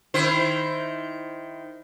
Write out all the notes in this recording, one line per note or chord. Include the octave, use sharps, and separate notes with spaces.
D#3 E4 C5